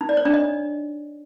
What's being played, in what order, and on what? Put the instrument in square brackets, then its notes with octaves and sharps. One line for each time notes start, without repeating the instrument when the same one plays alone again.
[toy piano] D#4
D5
C#5
D4
D#5